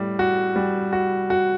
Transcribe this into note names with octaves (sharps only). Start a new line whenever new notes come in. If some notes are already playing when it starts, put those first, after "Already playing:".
Already playing: A2 G3
F#4
G3
F#4
F#4